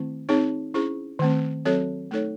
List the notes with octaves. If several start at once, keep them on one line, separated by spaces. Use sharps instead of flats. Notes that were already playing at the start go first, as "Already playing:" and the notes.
Already playing: D#3 A3 C4 E4
C4 D#4 G#4 C#5
C#4 E4 G#4 C5
D#3 A3 C4
F#3 C4 F#4 A4 C#5
A3 D#4 A4 C#5